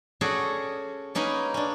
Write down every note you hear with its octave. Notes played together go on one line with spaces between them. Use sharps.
C#4 F#4 G#4 A4 D5
A#3 C#4 D#4 G#4 B4
C#4 D4